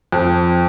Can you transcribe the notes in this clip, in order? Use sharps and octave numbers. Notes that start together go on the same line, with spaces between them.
F2